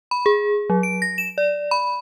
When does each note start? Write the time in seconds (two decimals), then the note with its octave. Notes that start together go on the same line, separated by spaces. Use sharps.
0.11 B5
0.26 G#4
0.70 F#3
0.83 D7
1.02 A#6
1.18 E7
1.38 D5
1.71 B5